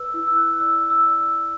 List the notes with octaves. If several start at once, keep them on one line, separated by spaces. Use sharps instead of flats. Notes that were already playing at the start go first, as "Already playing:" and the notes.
Already playing: B4 D5 E6
E4 E6
E6
F#6
D5 E6
E6
D5
E6